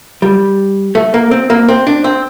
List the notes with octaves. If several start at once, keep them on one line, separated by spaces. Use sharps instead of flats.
G3
A3
A#3
C4
A#3
C4
D4
C4